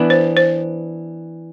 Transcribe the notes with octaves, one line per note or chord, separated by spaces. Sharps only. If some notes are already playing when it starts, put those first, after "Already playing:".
Already playing: E3 B3 D4
C5
C5